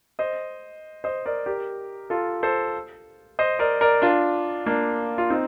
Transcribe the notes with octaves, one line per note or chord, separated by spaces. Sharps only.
C5 D#5
C5 D#5
A#4 D5
G4 A#4
F4 A4
A4 C5
C5 D#5
A#4 D5
A#4 D5
D4 F4
A#3 D4
F4
C4 D#4